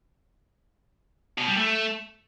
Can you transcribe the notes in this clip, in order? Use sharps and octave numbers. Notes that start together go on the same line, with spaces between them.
B2
G3
A3